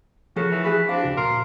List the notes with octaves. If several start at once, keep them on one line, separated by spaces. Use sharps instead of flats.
C#3 F3 F#4 A4 A#4
E3
F#4 G#4 B4 B5
C4 D4 F5
D2 C#3 F#4
A#2 A#4 C6